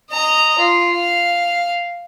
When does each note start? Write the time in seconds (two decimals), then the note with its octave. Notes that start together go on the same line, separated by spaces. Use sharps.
0.11 D#5 A#5
0.59 F4
0.96 F5